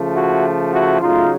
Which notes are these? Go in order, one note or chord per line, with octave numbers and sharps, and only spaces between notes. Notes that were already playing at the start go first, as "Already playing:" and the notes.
Already playing: C#3 F3 A3
E4 F#4
E4 F#4
C#3 F#3 A3 D#4 F4